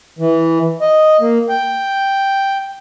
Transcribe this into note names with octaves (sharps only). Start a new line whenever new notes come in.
E3
D#5
A#3
G5